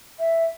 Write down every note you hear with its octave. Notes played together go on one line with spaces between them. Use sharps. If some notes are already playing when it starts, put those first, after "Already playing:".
E5